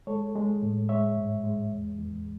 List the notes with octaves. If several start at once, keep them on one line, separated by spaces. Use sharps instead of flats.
G#3 A4 C#5
G#3
A2
G#3 C#5 E5
G#2
G#3
E2
E2